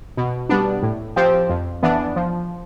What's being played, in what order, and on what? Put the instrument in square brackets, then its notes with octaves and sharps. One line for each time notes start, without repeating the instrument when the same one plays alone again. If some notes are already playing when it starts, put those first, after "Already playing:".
[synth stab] B2
G3 B3 D4
A2
F3 C4 G4 C5
F2
E3 B3 D4
F3